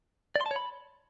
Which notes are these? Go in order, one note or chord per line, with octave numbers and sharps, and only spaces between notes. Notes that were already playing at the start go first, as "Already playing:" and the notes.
D5
C6
A5
C#5
B5